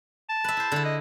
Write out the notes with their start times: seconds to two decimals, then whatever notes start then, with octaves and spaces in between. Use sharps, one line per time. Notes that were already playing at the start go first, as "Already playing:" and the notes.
0.29 A5
0.44 B4 E5
0.57 E4 C5
0.72 D3 E4
0.85 D#5